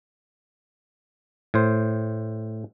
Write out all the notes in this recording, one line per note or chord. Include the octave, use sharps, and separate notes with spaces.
A2 C5